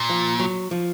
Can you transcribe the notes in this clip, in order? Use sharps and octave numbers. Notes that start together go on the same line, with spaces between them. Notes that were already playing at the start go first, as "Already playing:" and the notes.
Already playing: A#2
F3
F#3
F3